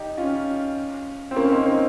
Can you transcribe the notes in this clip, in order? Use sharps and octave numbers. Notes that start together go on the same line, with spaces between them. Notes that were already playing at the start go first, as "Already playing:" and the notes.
Already playing: D#4 G4
C#4 F4
C4
A#3 C#4
C4 D#4
C4 D#4